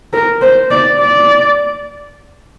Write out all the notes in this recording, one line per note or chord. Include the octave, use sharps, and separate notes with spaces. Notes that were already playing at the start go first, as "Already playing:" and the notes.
A#4
C5
D5
D5